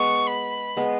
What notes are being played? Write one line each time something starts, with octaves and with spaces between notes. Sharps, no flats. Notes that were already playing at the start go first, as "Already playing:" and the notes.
Already playing: G#3 B3 C#6
B5
G#3 B3